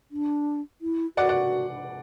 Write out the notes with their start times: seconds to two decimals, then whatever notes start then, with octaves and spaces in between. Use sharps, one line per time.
0.11 D4
0.81 E4
1.17 F#4 D5 F#5
1.29 D5 F#5